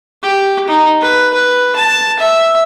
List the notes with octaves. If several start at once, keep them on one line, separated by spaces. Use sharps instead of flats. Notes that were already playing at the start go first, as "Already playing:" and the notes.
G4
D#4
B4
B4
A5
E5